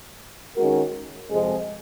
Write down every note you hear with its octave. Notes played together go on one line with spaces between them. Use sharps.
D#3 G#3 C#4 F#4 A#4
F2 C3 F3 G#3